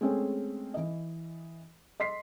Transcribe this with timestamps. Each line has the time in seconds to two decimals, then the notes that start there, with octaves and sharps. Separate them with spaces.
0.01 G#3 A3 C4 C#4 G#4
0.74 E3 D#5
2.00 D#5 C6 B6 C7